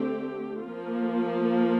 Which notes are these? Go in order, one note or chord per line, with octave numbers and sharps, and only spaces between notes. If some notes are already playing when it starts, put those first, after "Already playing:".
Already playing: D3 A3 C4 G4
F3 A#3 F4